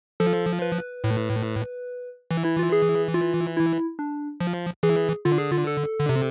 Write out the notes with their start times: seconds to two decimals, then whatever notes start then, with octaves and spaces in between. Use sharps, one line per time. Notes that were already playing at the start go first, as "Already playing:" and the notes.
0.20 F3 A4
0.62 B4
1.04 A2
2.31 E3
2.45 E4
2.59 F4
2.72 G#4
3.14 F4
3.57 E4
3.99 D4
4.41 F3
4.83 E3 G#4
5.25 D3 F4
5.38 G#4
5.52 F4
5.67 A4
6.00 D3
6.09 C3